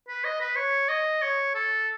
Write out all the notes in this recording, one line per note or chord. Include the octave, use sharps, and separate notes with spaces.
B4
D#5
B4
C#5
D#5
C#5
A4